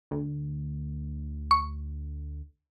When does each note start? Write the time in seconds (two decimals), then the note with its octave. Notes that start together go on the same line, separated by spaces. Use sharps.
0.11 D2
1.51 C#6